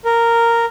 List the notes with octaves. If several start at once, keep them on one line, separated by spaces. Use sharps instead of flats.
A#4